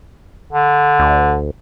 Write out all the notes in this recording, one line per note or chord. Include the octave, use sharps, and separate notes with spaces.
D3
D2